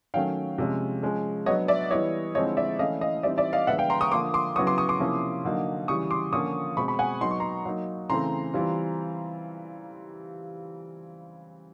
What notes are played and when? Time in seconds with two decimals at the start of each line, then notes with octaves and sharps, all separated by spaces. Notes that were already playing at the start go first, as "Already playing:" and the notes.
0.14 D#3 F#3 A3 C#4 F5 G5
0.58 C3 F3 G#3 C#4
1.03 F3 G#3 C#4
1.46 F#3 B3 D4 C#5 D#5
1.68 D5 E5
1.91 E3 G3 B3 E4 C#5 D#5
2.35 D3 F3 G#3 C4 E4 C#5 D#5
2.57 D5 E5
2.79 E3 A3 C#4 E4 D#5 F5
3.01 D#5 F5
3.23 E3 G3 C4 D#4 D5 E5
3.38 D5 E5
3.53 D#5 F5
3.67 D3 F3 G#3 B3 E5 F#5
3.78 F5 G5
3.90 A#5 C6
4.01 C#6 D#6
4.12 D3 F3 A#3 C6 D6
4.34 C6 D6
4.56 C#3 F#3 B3 E4 C#6 D#6
4.67 C6 D6
4.78 C#6 D#6
4.89 C6 D6
5.00 C3 F3 A#3 C#4 E4
5.45 D3 F#3 A#3 D#4
5.88 C#3 E3 G3 C#6 D#6
6.11 C6 D6
6.33 D3 F3 A#3 C#4 F4 C#6 D#6
6.77 B2 G#3 C4 B5 C#6
6.88 B5 C#6
6.99 F#5 G#5
7.21 F#3 B3 D#4 C6
7.31 C#6
7.40 A#5 C6
7.65 F#3 A#3 D#4
8.10 C#3 E3 A3 C4 A#5 C6
8.54 E3 G3 C4 F4